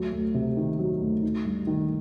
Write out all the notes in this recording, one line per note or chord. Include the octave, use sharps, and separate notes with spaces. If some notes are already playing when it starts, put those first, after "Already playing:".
Already playing: D2 F#3
D2
C3
D#3
F#3
D2
D#4
G2
D#3